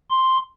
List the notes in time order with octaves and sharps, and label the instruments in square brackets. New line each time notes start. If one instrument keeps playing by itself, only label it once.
[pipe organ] C6